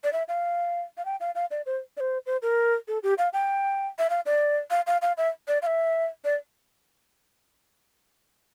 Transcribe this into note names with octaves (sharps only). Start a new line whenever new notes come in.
D5
E5
F5
F5
G5
F5
F5
D5
C5
D5
C5
C5
A#4
A4
G4
F5
G5
E5
F5
D5
F5
F5
F5
E5
D5
F5
E5
D5